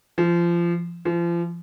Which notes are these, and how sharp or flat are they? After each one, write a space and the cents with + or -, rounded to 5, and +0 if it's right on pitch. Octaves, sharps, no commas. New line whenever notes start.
F3 -25
F3 -35